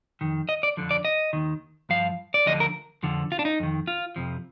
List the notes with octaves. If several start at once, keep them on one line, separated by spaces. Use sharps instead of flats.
F2 D#3
D#5
D5
F2 D3 F3
D5
D#5
D#2 D#3
G2 F3 F5
D5
D2 D3 F3 D#5
A#4
F2 D3 F3
F4
D4
D#4
F2 D#3
F4
F2 C3 F3